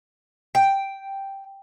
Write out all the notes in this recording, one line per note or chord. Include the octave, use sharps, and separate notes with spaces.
G5